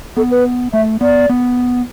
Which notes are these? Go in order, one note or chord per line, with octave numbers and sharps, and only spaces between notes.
B3 A4
B4
A3 E5
B3 D5
B3